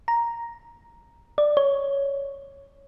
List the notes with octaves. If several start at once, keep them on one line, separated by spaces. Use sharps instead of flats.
A#5
D5
C#5